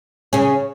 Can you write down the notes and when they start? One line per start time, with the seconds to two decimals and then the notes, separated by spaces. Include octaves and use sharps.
0.33 C#3 C#4